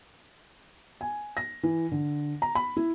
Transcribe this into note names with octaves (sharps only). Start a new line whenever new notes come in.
G#5
A#6
E3
D3
A#5
B5
E4